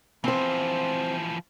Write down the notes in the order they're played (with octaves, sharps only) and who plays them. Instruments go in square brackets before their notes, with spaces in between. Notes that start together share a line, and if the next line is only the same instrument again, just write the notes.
[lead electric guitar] E3 F3 [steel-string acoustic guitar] C4 C5